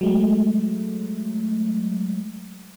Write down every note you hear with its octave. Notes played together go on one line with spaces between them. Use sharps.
F#3 G#3 A3